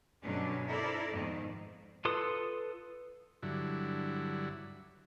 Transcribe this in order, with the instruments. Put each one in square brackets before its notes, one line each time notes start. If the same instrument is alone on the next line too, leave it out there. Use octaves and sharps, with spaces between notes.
[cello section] G2 B2 D3 F#3 C#4 D4
E4 A4 A#4 C5 D5
F2 G#2 B2 D#3
[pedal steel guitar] F4 A4 B4 C6 D#6
[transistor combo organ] G2 D3 F#3 E4